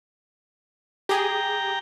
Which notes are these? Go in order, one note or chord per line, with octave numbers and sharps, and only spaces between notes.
G4 G#4 G5 A#5